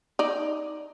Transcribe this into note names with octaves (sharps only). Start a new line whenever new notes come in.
D#4 D5